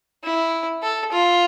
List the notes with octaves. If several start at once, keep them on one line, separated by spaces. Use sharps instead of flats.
E4
A4
F4